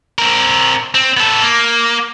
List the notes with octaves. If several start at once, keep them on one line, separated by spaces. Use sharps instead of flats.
C4 A#4
C4
B3 A4
A#3